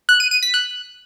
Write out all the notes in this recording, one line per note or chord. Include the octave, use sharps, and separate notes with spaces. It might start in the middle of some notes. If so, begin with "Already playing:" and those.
F#6
D#7
D#7
B6
F#6